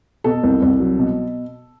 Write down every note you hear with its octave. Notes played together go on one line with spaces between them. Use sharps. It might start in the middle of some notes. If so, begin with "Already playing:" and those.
B2 A4
C2
C2
F#3
B2